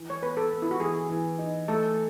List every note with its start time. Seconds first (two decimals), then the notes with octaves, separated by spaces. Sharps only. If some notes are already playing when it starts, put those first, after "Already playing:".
Already playing: E3
0.10 C#5
0.22 B3 B4
0.37 A4
0.50 B3
0.62 E4
0.71 F#4
0.80 E3 G#4
1.10 E3
1.38 D#4
1.68 A3 A4